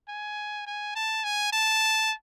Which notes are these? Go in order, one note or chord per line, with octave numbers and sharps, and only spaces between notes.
G#5
G#5
A5
G#5
A5